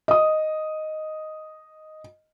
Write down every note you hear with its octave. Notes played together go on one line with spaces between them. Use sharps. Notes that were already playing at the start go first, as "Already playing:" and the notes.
D#5 D#6